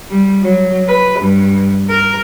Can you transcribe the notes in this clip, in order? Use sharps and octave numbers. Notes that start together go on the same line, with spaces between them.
G3
F#3
B4
G2
A#4